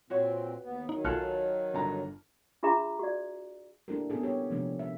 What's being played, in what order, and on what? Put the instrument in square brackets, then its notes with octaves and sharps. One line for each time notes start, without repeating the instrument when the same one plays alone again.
[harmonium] A#2 C4 [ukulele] F#4 B4 C#5
[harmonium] D#2 B3
[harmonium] D#3 F#3 [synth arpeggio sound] D#4
[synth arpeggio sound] B1 C#7 [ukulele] F4 G#4 A4 [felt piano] A5 F6 F#6
[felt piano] G1 A#5 [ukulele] D4 A4
[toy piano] D4 F4 G#4 E5 A#5 D6
F#4 D5
[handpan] A#3 D4 E4 G4 A4 A#4
B3 C#4 G#4 A4
G4 G#4 C#5
C3 F3 G#3 A#3 C#4 D4
E5